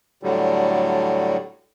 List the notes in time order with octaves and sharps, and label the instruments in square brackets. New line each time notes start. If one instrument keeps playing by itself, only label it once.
[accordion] A2 D3 F#3 G3